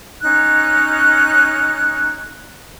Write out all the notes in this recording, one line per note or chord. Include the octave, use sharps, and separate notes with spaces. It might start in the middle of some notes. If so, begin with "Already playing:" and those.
C#4 D#4 F#6